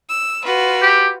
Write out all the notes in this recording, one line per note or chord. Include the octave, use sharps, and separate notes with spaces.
E6
F4 F#4 B4
G4